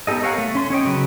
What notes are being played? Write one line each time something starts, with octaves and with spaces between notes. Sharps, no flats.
B3 D#4 G4 A4 D#5
A#4 C#5 F5 F#5 G#5
A3
C#4 C6
C#4 C#5 D#5 G5
C#3 F#3 B4